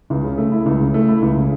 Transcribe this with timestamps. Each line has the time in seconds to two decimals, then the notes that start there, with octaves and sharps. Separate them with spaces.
0.10 C#2
0.24 C#3
0.38 A3
0.52 E4
0.66 C#2
0.80 C#3
0.94 A3
1.08 E4
1.22 C#2
1.36 C#3